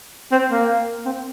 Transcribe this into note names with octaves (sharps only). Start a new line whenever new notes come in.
C4
A#3
C4